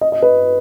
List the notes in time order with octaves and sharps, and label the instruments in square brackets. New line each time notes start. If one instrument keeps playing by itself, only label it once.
[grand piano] D#5
D#5
B4